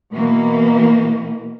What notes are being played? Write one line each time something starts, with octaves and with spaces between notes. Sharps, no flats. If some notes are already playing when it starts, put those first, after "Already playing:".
B2 E3 A#3